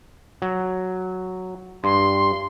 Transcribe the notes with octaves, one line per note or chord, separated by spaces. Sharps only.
F#3
G2 C6